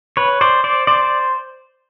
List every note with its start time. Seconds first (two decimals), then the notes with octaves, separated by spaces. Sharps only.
0.17 B4 C#5
0.41 C5 D5
0.64 C5 D5
0.87 C5 D5